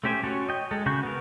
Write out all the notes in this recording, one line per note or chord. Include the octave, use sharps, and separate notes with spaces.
A3 C#4 G4 C5 G#5
C#4 F#4 C#5 A5
D#5 G5
G#3 A4
C#3 F#4 C#6 G6
B3 A#4